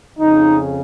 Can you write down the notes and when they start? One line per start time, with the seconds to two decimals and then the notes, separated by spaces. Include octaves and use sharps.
0.19 F2 C#3 D#4